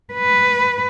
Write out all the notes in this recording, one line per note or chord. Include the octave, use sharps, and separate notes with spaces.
B4